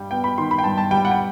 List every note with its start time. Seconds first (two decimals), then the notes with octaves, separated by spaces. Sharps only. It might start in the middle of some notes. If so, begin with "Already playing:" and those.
Already playing: G2 G3 G5
0.11 B3 G5
0.24 B5
0.38 D#3 C6
0.51 B5
0.58 G5
0.64 G2 A5
0.77 A5
0.91 G3 G5
1.05 F#5
1.11 G5